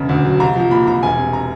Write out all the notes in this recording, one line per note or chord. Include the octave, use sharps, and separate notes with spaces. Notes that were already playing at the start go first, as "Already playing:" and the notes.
Already playing: E1 C#3
D2
F#3
C2 A#5
F3
A#2 B5
C2 A#5
E1 G#5
C3
A#5